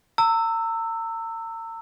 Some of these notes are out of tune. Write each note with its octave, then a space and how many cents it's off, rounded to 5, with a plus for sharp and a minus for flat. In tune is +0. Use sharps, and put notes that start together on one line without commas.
A#5 -40 E6 +0